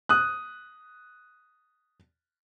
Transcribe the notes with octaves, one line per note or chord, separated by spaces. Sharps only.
D#6 F#6